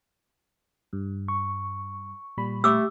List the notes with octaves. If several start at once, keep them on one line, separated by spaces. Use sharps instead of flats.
G2
C#6
A#2 G3 B5
A3 G4 D6 E6